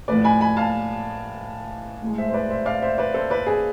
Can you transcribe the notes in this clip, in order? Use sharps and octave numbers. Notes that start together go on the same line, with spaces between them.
A2 F3 A3 B4 D5
G#5 B5
G#5 B5
F5 A5
A2 G#3
C5 E5
C5
B4 D5
C5 E5
D5 F5
C5 E5
B4 D5
A4 C5
B4 D5
G#4 B4